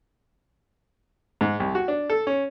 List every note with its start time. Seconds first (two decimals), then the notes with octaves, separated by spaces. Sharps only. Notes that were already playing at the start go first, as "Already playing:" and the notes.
1.41 G#2
1.60 C2
1.75 F#4
1.88 D4
2.10 A4
2.27 C#4